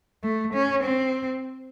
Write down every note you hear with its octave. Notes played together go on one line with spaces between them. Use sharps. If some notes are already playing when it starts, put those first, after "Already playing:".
A3
C#4
C4